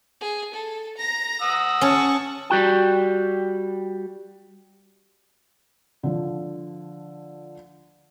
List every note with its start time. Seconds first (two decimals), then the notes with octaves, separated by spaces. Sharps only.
0.21 G#4
0.55 A4
0.98 A#5 A#6
1.42 F#5 D#6 E6
1.81 C#4 C#5 A5 C#6
2.50 G3 F#4 G5
6.03 D3 F3